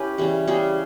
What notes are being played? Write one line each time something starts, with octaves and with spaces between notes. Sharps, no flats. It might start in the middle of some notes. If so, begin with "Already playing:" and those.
Already playing: C#4 E4 G4 B4
C#3 E3 G3
C#3 G3 C#4 G#4